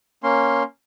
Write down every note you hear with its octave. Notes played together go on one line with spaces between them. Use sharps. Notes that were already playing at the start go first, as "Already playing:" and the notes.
A#3 C#4 C6